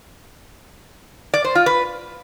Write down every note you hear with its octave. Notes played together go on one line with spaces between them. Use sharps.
D5
C5
F4
B4